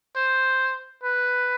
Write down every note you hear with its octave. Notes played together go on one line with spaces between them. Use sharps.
C5
B4